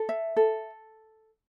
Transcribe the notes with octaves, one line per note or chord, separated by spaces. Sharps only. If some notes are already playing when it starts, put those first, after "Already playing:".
Already playing: A4
E5
A4